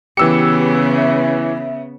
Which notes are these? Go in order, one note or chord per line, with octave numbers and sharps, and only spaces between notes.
C#3 E3 B3 G4 E6 C#7
E5